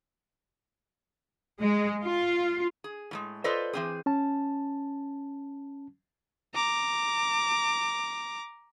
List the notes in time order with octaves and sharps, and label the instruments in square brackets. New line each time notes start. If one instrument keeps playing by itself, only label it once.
[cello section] G#3
F4
[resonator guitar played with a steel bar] G#4
A2 F3 G#3
F4 A4 B4 C5 D5 D#5
E3 C4 G#4
[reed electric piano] C#4 A5
[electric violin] A#5 D6